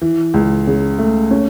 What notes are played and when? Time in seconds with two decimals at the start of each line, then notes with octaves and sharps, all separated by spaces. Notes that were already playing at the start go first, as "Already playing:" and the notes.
0.02 E3
0.34 C#2
0.67 C#3
0.99 A3
1.31 C#4